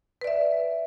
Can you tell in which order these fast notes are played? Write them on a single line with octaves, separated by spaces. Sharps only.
B4 D5 E5